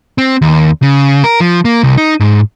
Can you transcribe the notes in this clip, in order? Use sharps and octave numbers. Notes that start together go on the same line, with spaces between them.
C4
D#2
C#3
A#4
F3
A#3
C2
D#4
G#2